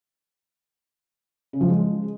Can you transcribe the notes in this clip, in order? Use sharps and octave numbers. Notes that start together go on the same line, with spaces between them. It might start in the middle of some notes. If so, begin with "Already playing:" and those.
C#3
F3
G#3